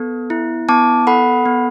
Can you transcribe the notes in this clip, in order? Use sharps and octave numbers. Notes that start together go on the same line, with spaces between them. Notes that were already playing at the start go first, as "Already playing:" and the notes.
Already playing: B3 A4
E4
B3 A5 D6
A4 F#5 B5
B3